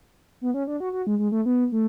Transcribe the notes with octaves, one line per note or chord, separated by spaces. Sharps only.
B3
C#4
D4
F#4
F#4
G#3
G#3
A3
B3
A3